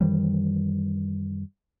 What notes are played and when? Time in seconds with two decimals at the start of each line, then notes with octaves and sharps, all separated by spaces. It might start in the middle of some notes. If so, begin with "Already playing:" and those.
0.01 F#2 D#3 E3 G3